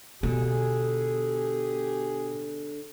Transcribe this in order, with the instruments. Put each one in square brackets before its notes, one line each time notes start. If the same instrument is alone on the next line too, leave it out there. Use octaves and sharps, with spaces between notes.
[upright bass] B2 [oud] D3 [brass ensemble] G4 G#4